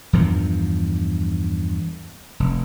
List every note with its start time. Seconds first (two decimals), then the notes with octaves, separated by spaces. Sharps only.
0.13 E2 G2 D#3 F3
2.40 F1